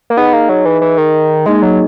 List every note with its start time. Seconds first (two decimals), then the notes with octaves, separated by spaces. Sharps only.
0.10 A#3
0.17 B3 D#4 G#4 D#5
0.33 A#3
0.49 F#3
0.65 E3
0.82 E3
0.98 D#3
1.46 G#3 A#3 D#4 G#4 D#5
1.62 F#3